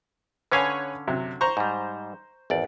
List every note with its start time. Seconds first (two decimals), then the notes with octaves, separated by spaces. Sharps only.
0.52 D3 C#4 B4 C#5 F5 G#5
1.08 C3 F#3
1.41 C5 A#5 C#6
1.57 G#2 G3
2.50 G#1 E2 D5